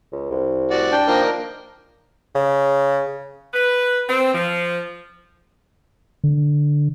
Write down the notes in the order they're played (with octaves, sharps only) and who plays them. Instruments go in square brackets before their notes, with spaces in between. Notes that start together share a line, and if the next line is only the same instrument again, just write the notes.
[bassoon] C#2
C2
[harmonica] F#4 D5
[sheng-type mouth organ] D4 G5
[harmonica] D#3 A#3 A#4 [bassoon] F3
[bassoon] C#3
[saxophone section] B4
C4
F3
[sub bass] D3